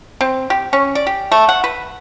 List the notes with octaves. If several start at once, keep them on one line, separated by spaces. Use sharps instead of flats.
C4
G4
C#4
D5
G4
A3
F#5
B4